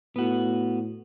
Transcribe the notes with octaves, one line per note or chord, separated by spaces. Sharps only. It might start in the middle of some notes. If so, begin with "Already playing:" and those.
A2 B3 F#4